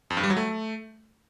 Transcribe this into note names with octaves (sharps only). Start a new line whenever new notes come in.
F2
G2
G3
F#3
A3